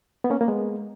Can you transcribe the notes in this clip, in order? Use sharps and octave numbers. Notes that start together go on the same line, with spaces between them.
B3
A#3 C#4
A#3
G#3 B3